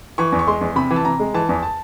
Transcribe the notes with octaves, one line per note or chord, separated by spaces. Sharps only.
E3 C#6
E2
C#6
G#3 C6
E2
C3 B5
E3
A5
C3 A#5
G#3
E3 A5
E2
A5